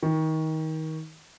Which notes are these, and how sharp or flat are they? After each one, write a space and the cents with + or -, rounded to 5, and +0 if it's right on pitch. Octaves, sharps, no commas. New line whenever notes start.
D#3 +25